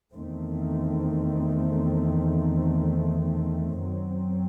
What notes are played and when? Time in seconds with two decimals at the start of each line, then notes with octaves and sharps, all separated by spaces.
0.14 E2 D#3 A3 C4
3.84 F#2 F#3 C4